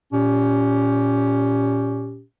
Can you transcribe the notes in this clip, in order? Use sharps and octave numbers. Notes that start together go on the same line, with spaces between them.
A#2 C#4 G4